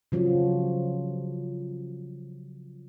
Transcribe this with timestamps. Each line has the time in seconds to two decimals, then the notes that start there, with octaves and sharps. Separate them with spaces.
0.12 C#3 F3 F#3